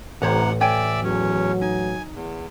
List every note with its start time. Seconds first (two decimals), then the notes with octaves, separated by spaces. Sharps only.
0.22 A1 A2 C3 C5 C#5 F#5 A#5
0.61 C#5 D5 E5 G5 G#5
1.03 E2 F#3 C#4
1.61 D#4 G#5
2.14 E2